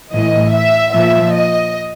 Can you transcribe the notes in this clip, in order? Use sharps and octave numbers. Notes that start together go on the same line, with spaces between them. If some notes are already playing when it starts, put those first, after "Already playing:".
A2 E3 D#5
E5
A#2 F3 E5
D#5